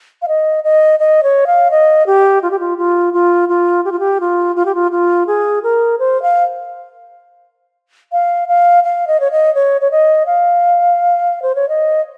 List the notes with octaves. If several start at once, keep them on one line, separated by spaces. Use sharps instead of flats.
F5
D#5
D#5
D#5
C#5
F5
D#5
G4
F4
G4
F4
F4
F4
F4
G4
F4
G4
F4
F4
G4
F4
F4
G#4
A#4
C5
F5
F5
F5
F5
D#5
C#5
D#5
C#5
C#5
D#5
F5
C5
C#5
D#5